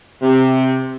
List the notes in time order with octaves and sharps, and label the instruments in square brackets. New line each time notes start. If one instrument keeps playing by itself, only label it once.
[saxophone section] C3